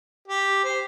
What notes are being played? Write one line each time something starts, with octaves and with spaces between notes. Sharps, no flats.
G4
C5